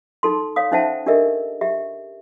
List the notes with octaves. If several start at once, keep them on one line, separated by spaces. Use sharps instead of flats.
D#4 A4 C6
C#5 F5 D#6
C#4 D#4 C5 E5 F#5 A5
D4 G4 A4 A#4 D#5 E5
G4 E5